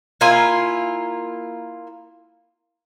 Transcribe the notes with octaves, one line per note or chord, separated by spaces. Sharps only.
A#3 E4 F4 G#5